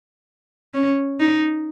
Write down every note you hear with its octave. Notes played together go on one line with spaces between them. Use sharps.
C#4
D#4